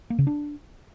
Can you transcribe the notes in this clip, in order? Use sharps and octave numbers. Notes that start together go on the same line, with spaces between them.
A#3
C#3
D4